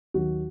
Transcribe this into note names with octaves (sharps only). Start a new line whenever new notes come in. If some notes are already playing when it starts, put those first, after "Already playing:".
D#2 D#3 F#3 F#4